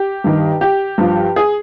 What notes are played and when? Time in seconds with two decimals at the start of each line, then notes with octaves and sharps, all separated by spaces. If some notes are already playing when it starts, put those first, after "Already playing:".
Already playing: G4
0.24 G2 D#3
0.61 G4
0.98 G2 F3
1.36 G#4